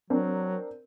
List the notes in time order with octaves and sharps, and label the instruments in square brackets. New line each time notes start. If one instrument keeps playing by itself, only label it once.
[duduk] F#3 [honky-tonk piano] C4 D4 A#4